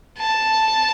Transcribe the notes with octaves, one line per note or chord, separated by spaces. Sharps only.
A5